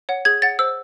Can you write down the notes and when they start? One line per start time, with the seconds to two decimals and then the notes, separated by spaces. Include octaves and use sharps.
0.09 C#5 F#5
0.25 G#4 G#6
0.42 C#5 F#5 A6
0.59 C5 E6